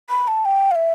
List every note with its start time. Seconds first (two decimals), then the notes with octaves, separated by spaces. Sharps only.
0.10 B5
0.28 A5
0.45 G5
0.71 F5
0.75 E5